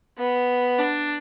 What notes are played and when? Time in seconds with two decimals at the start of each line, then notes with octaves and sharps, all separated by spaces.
0.18 B3
0.79 D4